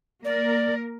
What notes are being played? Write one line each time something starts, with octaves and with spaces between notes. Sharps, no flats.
A#3 A#4 D5